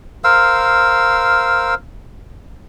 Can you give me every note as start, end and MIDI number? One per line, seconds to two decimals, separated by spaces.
0.24 1.74 70
0.24 1.74 72
0.24 1.74 77
0.24 1.74 88